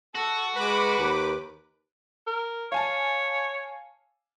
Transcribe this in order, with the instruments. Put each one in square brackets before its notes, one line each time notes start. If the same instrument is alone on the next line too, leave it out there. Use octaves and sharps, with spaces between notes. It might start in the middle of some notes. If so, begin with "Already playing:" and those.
[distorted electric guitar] F#4 [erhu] A4
[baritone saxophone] G#3 [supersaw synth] B4 D6 [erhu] B5
[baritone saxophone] D#2
[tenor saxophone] A#4
[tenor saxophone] C#5 [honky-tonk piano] F5 G#5 A5